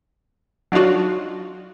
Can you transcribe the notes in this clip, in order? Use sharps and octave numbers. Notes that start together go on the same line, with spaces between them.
F#3 D4 D#4 F4 F#4